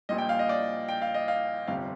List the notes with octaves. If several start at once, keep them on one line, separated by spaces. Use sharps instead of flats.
A#1 A#2 G3 D#5
G5
F5
D#5
D5
G5
F5
D#5
F5
G1 F2 C3 G3 F5